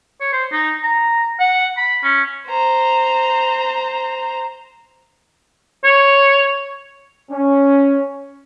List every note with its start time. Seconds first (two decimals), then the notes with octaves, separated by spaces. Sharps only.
0.21 C#5
0.32 C5
0.52 D#4
0.83 A#5
1.39 F#5
1.77 B5
2.03 C#4
2.48 C5 A#5
5.84 C#5
7.32 C#4